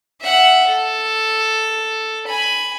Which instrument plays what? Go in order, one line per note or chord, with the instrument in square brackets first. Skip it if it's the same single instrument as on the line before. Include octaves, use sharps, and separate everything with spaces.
[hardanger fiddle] E5 F#5
A4
G#5 B5